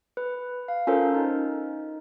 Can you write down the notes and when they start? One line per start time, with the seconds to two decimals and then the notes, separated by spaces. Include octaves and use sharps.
0.17 B4
0.68 F5
0.87 C#4 F4 A4 A#4 C5
1.15 D#4